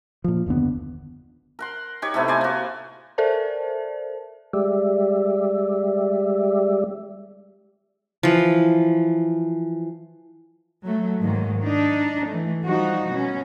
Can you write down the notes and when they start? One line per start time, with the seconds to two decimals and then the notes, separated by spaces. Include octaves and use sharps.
0.24 A#2 F3
0.46 F#1 D#2 D3 B3
1.59 A#4 F#5 C6
2.02 D#4 G4 C#5
2.14 A2 C3 A3 B3
2.28 C5 D5 G#5
2.41 A#3 F#4
3.18 A4 A#4 C5 D5 E5 A5
4.53 G3 G#3 G4 D5 E5
8.23 E3 F3
10.85 F#3 A3
11.20 G#2 D#3 F#3 A#3
11.61 D4 D#4
12.28 E3 A3
12.65 F3 G3 D#4 F#4
13.10 B2 C#4